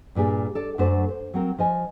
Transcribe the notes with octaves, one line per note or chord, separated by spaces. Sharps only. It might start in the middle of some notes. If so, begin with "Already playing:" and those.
G2 A#2 G3 G#4
A4 D5
F#2 F#3 A3 D4 C5
C5
F#3 C4 A#4
F3 D#5 G#5